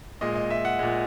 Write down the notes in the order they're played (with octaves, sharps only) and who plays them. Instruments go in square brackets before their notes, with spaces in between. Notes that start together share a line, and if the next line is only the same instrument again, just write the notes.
[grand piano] A#2 G#3 D#5
D#5
E5
F#5
A#2 G#3